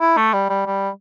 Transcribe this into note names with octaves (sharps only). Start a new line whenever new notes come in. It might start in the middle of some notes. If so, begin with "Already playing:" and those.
E4
A3
G3
G3
G3